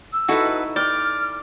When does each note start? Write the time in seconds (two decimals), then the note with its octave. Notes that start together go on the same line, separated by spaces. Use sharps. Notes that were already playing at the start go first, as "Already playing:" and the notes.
0.12 E6
0.28 D#4 E4 F#4 A4 B4
0.76 D5 G5 F6